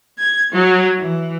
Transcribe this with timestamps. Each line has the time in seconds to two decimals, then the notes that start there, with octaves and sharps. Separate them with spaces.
0.18 G#6
0.53 F#3
0.98 E3